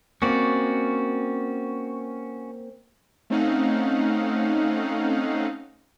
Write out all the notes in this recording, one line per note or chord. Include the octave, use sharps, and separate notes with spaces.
A#3 C4 C#4 F#4 D5
A3 C4 C#4 D#4 F5 F#5